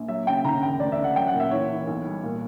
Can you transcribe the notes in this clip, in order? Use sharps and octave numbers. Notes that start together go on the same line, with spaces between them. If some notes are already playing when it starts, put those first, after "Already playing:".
Already playing: A#1
F#3 E5
C#3 G5
D3 A#5
E1 G5
D2 D5
E5
C#3
F#5
F#3 G5
F#5
A#2
E5
E3 C#5
E3
B1
G3
A#2